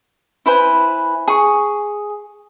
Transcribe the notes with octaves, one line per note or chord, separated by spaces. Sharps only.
E4 B4 C5 G#5
G#4 C#6